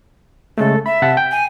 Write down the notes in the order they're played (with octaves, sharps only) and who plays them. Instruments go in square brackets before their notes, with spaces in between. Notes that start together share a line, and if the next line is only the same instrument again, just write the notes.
[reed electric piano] C#3 G#3 A3 [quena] A4
[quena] E5 [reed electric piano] B5
[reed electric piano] C3 F#5 A5
G5
[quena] G#5